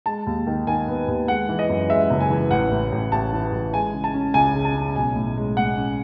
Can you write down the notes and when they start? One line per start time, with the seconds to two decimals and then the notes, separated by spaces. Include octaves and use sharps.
0.06 G#3 A5
0.27 D#2
0.47 D#3
0.67 D#3 G#5
0.87 B3
1.08 D#2
1.28 G#3 F#5
1.49 E3
1.59 D#5
1.69 F#2
1.90 G#3 E5
2.10 F#1
2.20 G#5
2.30 E3
2.51 A1 F#5
2.71 A1
2.92 A1
3.12 A1 A5
3.33 E3
3.52 A1
3.73 G#3 G#5
3.94 C#3
4.04 A5
4.14 C#4
4.34 C#2 G#5
4.55 C#3
4.65 A5
4.75 C#4
4.96 B1 G#5
5.16 A2
5.37 G#3
5.57 A2 F#5
5.77 C#4